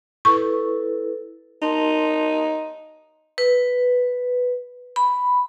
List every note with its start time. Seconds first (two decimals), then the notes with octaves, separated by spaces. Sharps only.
0.25 E4 A4 B4 C#6
1.62 D#4 A#4 A5 C6
3.38 B4
4.96 B5